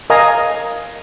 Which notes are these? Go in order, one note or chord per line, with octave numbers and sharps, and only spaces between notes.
A#4 D#5 F5 G#5 A#5 D#6